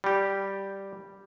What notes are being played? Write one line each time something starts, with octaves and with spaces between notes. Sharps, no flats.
G3 G4